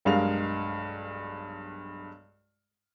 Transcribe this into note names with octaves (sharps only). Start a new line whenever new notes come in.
B1 G2 G#3 A#4 F5 F7